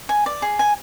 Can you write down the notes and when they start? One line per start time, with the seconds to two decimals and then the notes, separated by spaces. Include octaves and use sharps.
0.09 G#5
0.26 D5
0.42 G#4
0.59 G#5